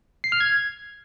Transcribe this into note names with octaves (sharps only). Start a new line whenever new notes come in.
C7
F6
G#6